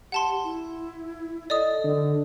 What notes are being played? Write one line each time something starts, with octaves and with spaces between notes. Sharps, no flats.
G4 F#5 A5 C6
E4
A4 D5 D#5 D#6
D3